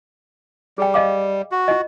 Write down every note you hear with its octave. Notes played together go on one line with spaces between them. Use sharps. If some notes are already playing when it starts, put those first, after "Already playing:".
G3 G#4 G5
D#5 F5 D6
F#4
F4 D#5